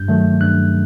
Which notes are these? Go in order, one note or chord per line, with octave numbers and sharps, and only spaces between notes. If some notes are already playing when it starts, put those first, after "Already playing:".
Already playing: G2 G6
D#3 F#3 A3
G2 F#6